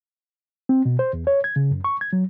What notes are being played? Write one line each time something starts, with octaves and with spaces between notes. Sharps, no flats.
C4
B2
C5
E2
C#5
G#6
C#3
F#2
C#6
G#6
F#3